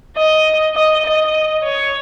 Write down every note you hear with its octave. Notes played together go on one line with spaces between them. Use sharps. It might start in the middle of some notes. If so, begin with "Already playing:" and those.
D#5
D#5
D#5
C#5